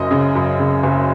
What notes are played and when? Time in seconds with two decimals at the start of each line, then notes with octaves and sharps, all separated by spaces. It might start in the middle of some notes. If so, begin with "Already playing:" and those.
Already playing: F#1 F#2 D#5
0.11 C#3
0.35 F#2
0.59 C#3
0.83 F#1